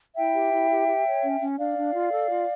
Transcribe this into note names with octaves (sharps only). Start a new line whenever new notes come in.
E4 E5 G5
G4
E4
G4
G4
C#5
C#4
C#4
D4 D5 F5
D4
F4
A4
F4